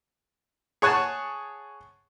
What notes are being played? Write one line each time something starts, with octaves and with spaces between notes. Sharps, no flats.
G#4 C#5 F#5 G#5 A5